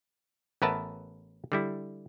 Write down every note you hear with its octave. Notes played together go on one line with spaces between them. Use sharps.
A1 B3 A#4 B4 E5 A5
D3 G3 E4